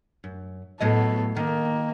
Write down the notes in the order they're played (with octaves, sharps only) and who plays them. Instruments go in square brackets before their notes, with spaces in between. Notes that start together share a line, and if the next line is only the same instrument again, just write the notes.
[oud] F#2
[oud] A2 F#3 D#5 [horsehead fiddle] B3 A4
[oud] D#3 [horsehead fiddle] A#3